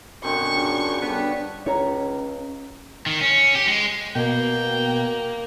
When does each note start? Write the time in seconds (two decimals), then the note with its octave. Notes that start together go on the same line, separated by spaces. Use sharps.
0.24 F#2 B2 D3 C4 C#6
0.57 C#3 F3 D4
1.02 D3 G3 B3
1.66 C#2 C#4 C#5 A#5
3.06 D#3
3.21 C#4
3.55 G4
3.67 G#3
4.15 B2 A#3 G5